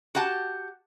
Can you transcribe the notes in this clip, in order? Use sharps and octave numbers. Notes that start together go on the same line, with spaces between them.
F#4 G4 F#5 A5